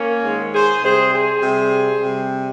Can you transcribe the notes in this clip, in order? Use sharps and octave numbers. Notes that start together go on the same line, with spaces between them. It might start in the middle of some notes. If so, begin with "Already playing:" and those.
Already playing: A#3 C#4
G#2 D#3 G#3
G#4 C5
C3 G3 G#4 C5
G#4 C5
C3 G3
C3 G3